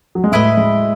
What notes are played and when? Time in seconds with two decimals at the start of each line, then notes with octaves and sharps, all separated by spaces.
0.15 F#3
0.24 G#3
0.32 A2 A3 E4 B4 D#5
0.57 G#3